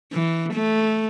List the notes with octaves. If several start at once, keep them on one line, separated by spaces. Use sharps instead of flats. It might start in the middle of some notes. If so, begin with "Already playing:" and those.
E3
A3